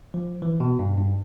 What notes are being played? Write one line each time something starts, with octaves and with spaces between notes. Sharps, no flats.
F3
E3
B2
G2
G2